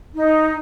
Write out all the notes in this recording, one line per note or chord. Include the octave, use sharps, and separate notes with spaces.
D#4